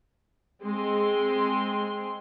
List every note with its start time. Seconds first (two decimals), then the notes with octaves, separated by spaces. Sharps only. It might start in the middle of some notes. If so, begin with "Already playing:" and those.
0.62 G#3 C4 C6